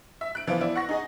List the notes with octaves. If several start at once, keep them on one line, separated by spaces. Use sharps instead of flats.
E5
F#6 D7
E3 F3 B3 F4
B3 E4 D5
F#5 C#6 A#6
D#4 G#4 D#5